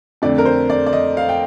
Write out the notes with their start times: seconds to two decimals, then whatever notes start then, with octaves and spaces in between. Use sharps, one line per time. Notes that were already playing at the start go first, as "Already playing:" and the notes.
0.22 F2 D3 A3 C4 D5
0.38 A#4
0.45 C5
0.70 D5
0.86 D5
0.93 D#5
1.17 F5
1.29 G5